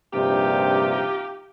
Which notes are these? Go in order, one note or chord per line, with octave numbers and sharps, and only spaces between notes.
A#1 G2 C3 D#4 F4 G4